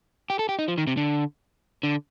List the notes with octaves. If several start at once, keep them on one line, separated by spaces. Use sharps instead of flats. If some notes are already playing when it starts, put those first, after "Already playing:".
G4
A4
G4
D#4
F3
D#3
C3
D3
D3